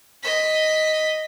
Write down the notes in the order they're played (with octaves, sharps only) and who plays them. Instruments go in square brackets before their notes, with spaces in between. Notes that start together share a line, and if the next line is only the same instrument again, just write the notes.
[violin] D#5 B6